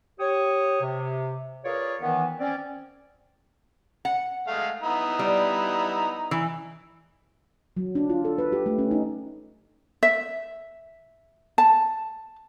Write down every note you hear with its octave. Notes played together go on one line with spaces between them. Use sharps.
G4 C#5 D#6
C3
F4 G#4 A#4 B4 C#5 D5
D#3 E3 B3
C4 C#4 D5
F#5
G#3 A3 F5
B3 D#4 E4
G3
E3
F#3
D4
F4
A4
B4
G4
A3
C#4
D#4
E5
A5